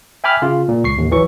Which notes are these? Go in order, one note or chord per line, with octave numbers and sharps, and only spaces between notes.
E5 G5 G#5 B5 D6 F6
C#3 F4
A#2
C#2 C#6 C7
A1 D#2
E3 F#3 C#6